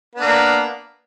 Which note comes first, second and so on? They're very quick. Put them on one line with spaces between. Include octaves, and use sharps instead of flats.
B3 D4 A#3